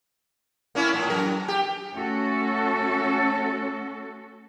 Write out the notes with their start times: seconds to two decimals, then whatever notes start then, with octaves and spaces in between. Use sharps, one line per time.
0.75 A#3 C#4 E4
0.94 A2
1.10 F#2 A#4
1.48 G4
1.94 A3 C#4 F#4 A4